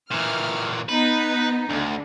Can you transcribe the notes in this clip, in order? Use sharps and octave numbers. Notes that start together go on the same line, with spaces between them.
A#2 E3 F6
B3 D#4 B4
D2 D3